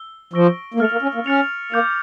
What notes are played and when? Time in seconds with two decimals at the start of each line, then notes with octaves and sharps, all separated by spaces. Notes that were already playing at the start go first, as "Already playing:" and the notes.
Already playing: E6 G7
0.33 F3 C#6 E6 A#6 D7 G7
0.74 A#3
0.80 A3 F6 A6 C#7 F7
0.92 A#3
1.02 C#4
1.15 A#3
1.26 C#4 F6 A6 C#7 F7
1.72 A#3 D6 G6 C#7 F7